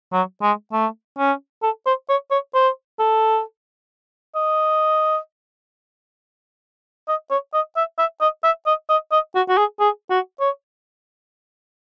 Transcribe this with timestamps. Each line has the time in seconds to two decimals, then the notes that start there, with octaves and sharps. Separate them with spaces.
0.13 F#3
0.42 G#3
0.73 A3
1.18 C#4
1.63 A4
1.86 C5
2.09 C#5
2.31 C#5
2.54 C5
2.99 A4
4.35 D#5
7.08 D#5
7.31 C#5
7.54 D#5
7.76 E5
7.98 E5
8.21 D#5
8.44 E5
8.66 D#5
8.89 D#5
9.12 D#5
9.35 F#4
9.49 F#4
9.58 G#4
9.80 G#4
10.10 F#4
10.40 C#5